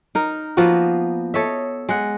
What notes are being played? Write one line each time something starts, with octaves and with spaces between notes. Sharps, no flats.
D#4 A#4
F3 A#3 B3 F#4
A4 C#5 D#5 E5
G#3 F#5